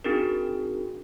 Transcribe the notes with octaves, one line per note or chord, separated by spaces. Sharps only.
C4 D4 D#4 F#4 G#4 A#4